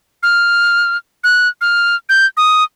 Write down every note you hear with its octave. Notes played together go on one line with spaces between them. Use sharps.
F6
F#6
F6
G6
D#6